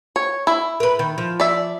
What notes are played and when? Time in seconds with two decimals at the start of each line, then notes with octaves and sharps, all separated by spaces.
0.16 C#5
0.47 E4
0.80 A#4 B4
0.99 D#3
1.18 F3
1.40 D5 E5